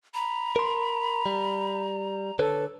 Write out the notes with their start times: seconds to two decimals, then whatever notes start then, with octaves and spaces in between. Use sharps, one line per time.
0.14 A#5 B5
0.56 A#4 C6
1.26 G3
2.39 D3 A4 B4 C#5